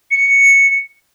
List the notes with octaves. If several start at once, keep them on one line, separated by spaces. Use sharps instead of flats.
C#7